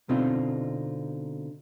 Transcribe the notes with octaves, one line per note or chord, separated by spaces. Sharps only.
B2 D3 C4 D#4 F4